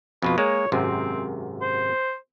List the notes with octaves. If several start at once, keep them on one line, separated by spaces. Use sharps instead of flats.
F2 B2 F4 B4
G#3 A#3 C#5
G#1 F#2 C3 C4
C5